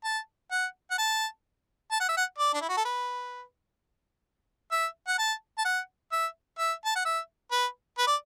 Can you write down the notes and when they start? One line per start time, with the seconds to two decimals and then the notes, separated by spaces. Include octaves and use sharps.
0.04 A5
0.52 F#5
0.91 F#5
0.98 A5
1.92 A5
2.00 F#5
2.09 E5
2.17 F#5
2.39 D5
2.53 D4
2.61 E4
2.69 F#4
2.77 A4
2.85 B4
4.72 E5
5.08 F#5
5.19 A5
5.58 A5
5.65 F#5
6.12 E5
6.59 E5
6.85 A5
6.96 F#5
7.05 E5
7.52 B4
7.98 B4
8.07 D5